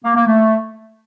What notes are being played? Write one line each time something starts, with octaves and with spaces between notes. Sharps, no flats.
A#3
A#3
A3